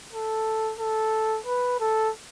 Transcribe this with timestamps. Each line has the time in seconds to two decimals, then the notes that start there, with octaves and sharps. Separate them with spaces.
0.13 A4
0.79 A4
1.46 B4
1.80 A4